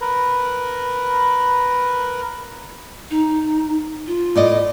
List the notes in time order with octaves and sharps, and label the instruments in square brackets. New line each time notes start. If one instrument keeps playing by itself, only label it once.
[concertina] A#4 B4
[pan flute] D#4
F4
[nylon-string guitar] A2 D5 D#5